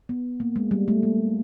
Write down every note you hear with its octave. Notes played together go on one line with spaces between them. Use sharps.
B3
A#3
G#3
G3
A3
A#3